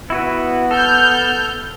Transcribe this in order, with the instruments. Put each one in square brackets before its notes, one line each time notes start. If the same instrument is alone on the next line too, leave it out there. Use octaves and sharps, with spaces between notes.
[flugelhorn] B3 [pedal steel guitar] E4 F#4 B4
[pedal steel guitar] A4 [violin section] F6 G6